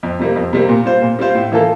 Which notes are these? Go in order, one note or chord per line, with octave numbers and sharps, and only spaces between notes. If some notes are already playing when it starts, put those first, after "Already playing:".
F2
C3 G3 A#3
F2
C3 G3 A#3
A#2
G3 C4 F4 C5
A#2
G3 C4 F4 C5
A2
E3 A#3 F4 A4